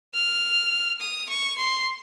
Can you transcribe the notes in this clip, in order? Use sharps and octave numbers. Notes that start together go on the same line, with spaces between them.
F6
D#6
C#6
C6